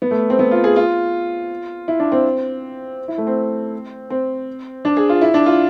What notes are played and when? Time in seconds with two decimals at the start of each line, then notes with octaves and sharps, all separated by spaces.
0.02 B3
0.11 A3
0.30 C4
0.39 B3
0.51 F4
0.64 G#4
0.76 F4
1.88 E4
2.00 D4
2.12 C4
3.08 E4
3.18 A3
3.27 C4
4.10 C4
4.85 D4
4.97 G#4
5.09 F4
5.21 E4
5.34 D4
5.46 F4